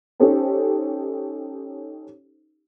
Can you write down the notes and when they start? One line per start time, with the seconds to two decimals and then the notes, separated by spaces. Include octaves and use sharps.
0.20 C#4 D#4 G4 A4 C5 C#5